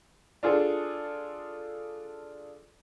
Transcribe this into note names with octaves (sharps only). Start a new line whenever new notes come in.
D4 F4 G#4 A4